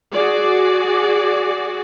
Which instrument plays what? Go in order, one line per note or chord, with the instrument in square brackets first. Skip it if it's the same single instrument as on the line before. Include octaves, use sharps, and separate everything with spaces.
[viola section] F#4 G#4 D5